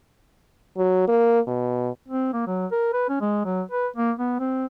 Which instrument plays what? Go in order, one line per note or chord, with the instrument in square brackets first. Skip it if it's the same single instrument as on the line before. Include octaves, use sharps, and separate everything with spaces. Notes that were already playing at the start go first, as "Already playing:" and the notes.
[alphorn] F#3
A#3
B2
[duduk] C4
A#3
F#3
A#4
B4
C#4
G#3
F#3
B4
A#3
B3
C4